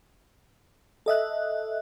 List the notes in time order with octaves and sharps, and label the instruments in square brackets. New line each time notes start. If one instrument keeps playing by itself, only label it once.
[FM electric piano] A4 D#5 E5 F#6